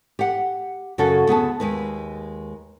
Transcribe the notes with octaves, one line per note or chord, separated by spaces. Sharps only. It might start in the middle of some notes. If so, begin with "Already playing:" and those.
G4 F#5
F#2 C#3 C#4 F#4 A4
D2 B3 G#4 A5
D#2 G#3 B4